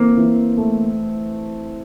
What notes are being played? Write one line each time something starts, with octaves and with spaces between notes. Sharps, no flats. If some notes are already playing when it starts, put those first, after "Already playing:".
Already playing: E3 A#3 C4
E3
A3